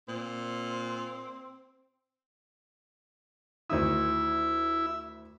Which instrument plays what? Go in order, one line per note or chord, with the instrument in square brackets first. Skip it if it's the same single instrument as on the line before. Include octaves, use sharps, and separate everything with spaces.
[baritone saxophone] A#2 [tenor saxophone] C4
[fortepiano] D2 D#3 D#6 [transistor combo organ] E4 E5